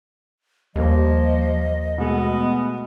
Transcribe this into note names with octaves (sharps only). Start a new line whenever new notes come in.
D#2 F3 G3 A#3 D#5
B2 G#3 A3 B3